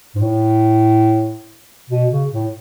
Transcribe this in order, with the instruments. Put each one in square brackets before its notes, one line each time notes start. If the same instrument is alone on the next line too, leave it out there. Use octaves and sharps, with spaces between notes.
[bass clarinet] G#2
A2
B2
C#3
A2